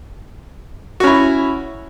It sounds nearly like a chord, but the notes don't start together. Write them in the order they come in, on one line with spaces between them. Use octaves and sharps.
F#4 C#4 E4